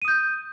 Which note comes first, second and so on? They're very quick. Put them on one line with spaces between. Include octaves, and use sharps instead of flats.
D#7 D#6 G6